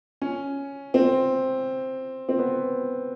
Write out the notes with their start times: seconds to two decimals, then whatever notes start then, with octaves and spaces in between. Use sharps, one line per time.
0.22 C#4
0.94 C4
2.29 C4
2.39 B3